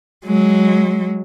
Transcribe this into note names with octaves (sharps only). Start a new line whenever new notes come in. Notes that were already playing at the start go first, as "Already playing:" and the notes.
F#3 G#3